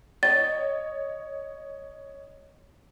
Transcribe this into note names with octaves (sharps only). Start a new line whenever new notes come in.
C#5 D#5 A6